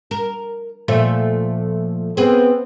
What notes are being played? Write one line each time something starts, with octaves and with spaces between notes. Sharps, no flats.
A#4
A#2 F3 A3
B3 C4 G#4 B4